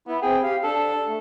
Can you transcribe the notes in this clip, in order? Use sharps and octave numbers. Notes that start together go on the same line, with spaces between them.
B3 E4
C4 G#4 G5
G4 F5
D4 A4
A3